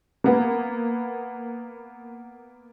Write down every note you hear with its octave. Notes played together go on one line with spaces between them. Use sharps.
A#3 B3